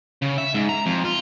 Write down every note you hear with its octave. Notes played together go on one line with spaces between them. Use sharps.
C#3
E5
G#2
A#5
F2
F4